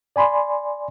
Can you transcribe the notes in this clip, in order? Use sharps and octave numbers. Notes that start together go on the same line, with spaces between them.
D5 G#5 B5 C6